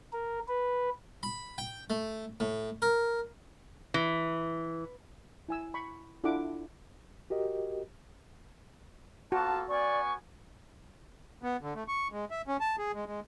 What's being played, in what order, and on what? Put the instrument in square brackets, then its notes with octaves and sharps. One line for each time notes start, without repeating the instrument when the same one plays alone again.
[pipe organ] A#4
B4
[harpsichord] B5
G5
A3
A2
A#4
[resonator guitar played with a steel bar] E3
[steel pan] E4 G#5 E6
B5 C#6
D4 E4 F4 A4 F#5 D6
[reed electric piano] F#4 G4 A#4 D#5
[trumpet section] A#3 F4 A4 [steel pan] F#4 [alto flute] A5
[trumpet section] B3 C#4 G#5 [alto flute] D5 [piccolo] C#6
[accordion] B3
D3
A3
C#6
G#3
E5
C#4
A5
G#4
G#3
G#3